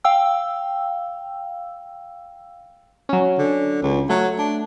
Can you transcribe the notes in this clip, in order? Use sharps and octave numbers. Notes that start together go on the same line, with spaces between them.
F5 G5 E6
F#3 C#4
D3
C#2
F#3 A3
D4